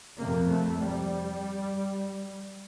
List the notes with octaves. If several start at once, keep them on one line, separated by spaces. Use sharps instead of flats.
F2 C3 A#3
A3
G3